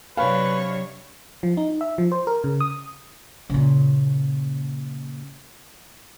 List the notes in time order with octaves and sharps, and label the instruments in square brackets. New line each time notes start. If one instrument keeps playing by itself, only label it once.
[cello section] C3 F#3 D4 [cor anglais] B4 [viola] C#5 [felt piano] F5
[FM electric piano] F3
D#4
E5
F3
C5
A#4
C#3
D#6
[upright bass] A#2 C#3